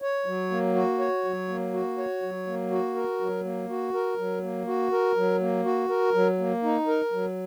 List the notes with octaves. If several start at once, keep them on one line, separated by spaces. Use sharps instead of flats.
C#5
F#3
A#3
F#4
C#5
F#3
A#3
F#4
C#5
F#3
A#3
F#4
A#4
F#3
A#3
F#4
A#4
F#3
A#3
F#4
A#4
F#3
A#3
F#4
A#4
F#3
A#3
D#4
A#4
F#3